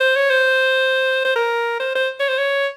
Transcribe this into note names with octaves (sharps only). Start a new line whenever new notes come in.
C5
C#5
C5
C5
A#4
C5
C5
C#5
C5
C#5